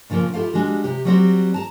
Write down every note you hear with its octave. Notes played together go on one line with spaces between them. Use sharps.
A#2 C#3 E3 F3 A#3
E4 F4 G4 A4 F5
G3 G#3 D4 F#4
C3 G4
F#3 G3 C4 F#4
A5 A#5